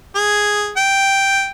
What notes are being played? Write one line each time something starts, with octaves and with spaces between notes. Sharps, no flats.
G#4
G5